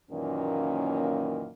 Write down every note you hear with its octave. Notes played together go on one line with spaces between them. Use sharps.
F#2 A#2 D#3 E3 A#3 C#4